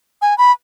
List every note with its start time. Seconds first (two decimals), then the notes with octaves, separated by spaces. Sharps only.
0.22 G#5
0.38 B5